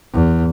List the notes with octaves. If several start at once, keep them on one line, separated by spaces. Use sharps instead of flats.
E2